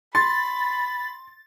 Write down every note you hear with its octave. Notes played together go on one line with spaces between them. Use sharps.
B5 C6 A6